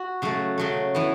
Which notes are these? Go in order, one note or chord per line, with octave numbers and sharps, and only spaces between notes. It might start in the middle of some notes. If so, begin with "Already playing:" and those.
Already playing: F#4
C#3 F#3 A3
C#3 F#3 A3
E3 B3